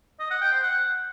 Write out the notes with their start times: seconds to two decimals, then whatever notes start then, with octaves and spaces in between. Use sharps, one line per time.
0.20 D#5
0.30 F#5
0.41 G5
0.52 C5
0.63 F#5